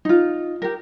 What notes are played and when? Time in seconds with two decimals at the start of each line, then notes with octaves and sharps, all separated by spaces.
0.05 D#4 F4
0.62 G4 A#4